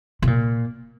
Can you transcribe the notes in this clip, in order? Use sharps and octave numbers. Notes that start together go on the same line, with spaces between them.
C3
A#2